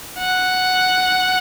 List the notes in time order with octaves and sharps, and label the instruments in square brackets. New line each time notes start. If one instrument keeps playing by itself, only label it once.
[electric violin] F#5